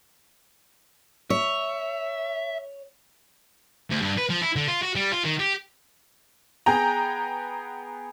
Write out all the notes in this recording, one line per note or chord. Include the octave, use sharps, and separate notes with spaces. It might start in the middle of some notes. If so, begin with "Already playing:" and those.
C#5 E5
D2
G2
B4
F3
E4
D3
F4
F#4
G3
F4
D#3
G4
B3 G#4 G5 A#5